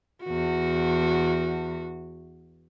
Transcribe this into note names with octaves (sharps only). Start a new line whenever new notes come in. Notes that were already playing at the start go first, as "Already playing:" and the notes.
E2 F#4